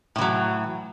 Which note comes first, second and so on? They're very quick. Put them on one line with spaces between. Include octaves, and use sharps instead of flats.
A2 E3 F#3